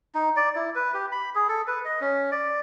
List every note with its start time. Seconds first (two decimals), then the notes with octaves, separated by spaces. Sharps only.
0.15 D#4
0.36 D5
0.55 E4
0.75 B4
0.94 G4
1.12 B5
1.35 G#4
1.49 A4
1.67 B4
1.85 D#5
2.01 C#4
2.32 D5